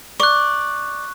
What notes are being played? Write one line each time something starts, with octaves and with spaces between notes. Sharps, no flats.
D5 C#6 F#6